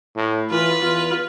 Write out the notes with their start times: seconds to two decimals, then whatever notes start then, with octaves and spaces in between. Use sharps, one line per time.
0.16 A2
0.51 E3 F4 B4
0.82 E2 F4